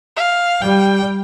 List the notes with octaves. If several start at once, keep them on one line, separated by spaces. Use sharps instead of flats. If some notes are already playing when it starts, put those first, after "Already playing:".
F5
G3 G5